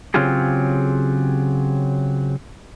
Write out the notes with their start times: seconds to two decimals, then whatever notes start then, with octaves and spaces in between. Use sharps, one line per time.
0.14 C#3 F#3 C4 F4 G4 G#4